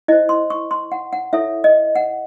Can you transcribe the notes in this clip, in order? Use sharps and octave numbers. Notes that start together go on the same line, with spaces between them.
E4 C5 D#5
C6
C#6
C6
F#5
F#5
E4 A4 C#5 E5
D#5
F#5